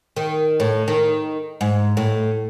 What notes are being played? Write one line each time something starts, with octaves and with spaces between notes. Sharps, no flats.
D#3
A2
D#3
G#2
A2